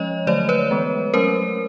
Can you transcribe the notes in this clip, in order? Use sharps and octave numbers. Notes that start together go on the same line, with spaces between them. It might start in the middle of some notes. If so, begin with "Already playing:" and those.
Already playing: F3 G#3 C#4 C#5 D#5
D3 F#3 A3 C5 D5
B4 C#5
E3 G#3 B3
F#3 A3 C#4 A#4 C5